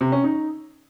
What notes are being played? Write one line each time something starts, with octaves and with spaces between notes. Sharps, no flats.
C3
C#4
D#4